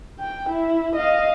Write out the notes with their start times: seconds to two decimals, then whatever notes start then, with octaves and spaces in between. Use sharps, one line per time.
0.20 G5
0.49 E4
0.96 D#5 F5